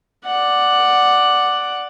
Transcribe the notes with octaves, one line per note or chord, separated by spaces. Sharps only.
D5 F#5